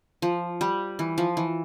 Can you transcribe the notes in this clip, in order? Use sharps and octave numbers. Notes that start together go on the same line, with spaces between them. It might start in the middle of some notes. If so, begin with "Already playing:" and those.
F3
G3
E3
F3
E3